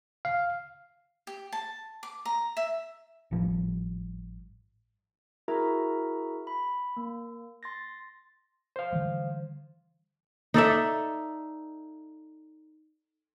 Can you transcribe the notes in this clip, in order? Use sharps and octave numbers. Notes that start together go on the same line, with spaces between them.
F5
G4
A5
D6
A#5
E5
G#1 A2 F3 G3
E4 F#4 G#4 A#4 E5 A#5
B5
A#3
C6 A6 A#6
C5 F5
D3 E3 G3
D#4 A4 D5 E5